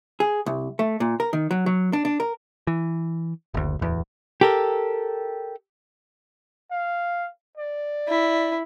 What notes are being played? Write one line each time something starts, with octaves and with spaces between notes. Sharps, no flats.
G#4
C2
A3
A#2
A#4
D#3
F#3
F#3
D4
D4
A#4
E3
F#1 D2
D1 E2
G4 A4 A#4
F5
D5
E4